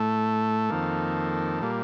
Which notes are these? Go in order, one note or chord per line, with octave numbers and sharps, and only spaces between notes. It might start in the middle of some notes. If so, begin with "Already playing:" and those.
Already playing: A2 A3 A4
F2 D#3 A#3
A#2 G3 A#3